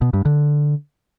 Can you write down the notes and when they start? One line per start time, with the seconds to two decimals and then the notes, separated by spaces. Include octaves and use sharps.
0.02 B2
0.13 G2
0.25 D3